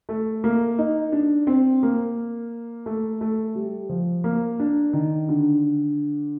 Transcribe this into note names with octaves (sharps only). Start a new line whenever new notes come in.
A3
A#3
D#4
D4
C4
A#3
A3
A3
G3
F3
A#3
D4
D#3
D3